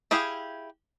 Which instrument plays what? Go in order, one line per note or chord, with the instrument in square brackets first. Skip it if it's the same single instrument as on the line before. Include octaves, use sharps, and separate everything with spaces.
[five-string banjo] E4 G4 G#4 F5